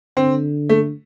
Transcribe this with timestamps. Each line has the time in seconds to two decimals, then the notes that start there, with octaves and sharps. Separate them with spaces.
0.17 D3 C4
0.69 A3